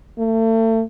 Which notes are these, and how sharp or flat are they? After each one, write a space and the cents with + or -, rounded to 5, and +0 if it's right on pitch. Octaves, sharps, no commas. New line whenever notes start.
A3 +35